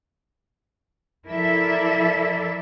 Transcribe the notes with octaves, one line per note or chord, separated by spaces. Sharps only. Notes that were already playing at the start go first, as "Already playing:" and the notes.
F3 E4 A4 A#4 D5 E5